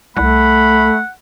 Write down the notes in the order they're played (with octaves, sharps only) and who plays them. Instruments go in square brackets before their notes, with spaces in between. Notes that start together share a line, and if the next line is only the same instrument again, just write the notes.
[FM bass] C2 [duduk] A3 [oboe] F#5 [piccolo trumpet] B5